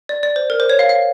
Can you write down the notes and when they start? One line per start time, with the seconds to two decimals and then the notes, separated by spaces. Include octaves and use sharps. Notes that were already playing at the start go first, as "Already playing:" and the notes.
0.09 D5
0.23 D5
0.36 C5
0.50 A#4
0.60 C5
0.70 C#5
0.79 F5
0.89 F5